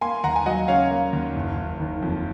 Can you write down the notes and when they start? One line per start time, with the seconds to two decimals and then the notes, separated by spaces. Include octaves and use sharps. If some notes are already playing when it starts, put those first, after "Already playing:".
0.01 A#3 G#5 C6
0.24 D#2 F#5 A#5
0.36 G#5
0.46 F#3 D#5 F#5
0.68 C#3 C#5 F5
0.91 A#3
1.13 D#2
1.36 F#1
1.57 F#1
1.80 D#3
2.02 F2